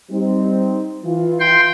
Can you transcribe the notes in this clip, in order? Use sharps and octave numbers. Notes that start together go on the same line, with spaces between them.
G3 C4 D#4
E3 F4
G5 C6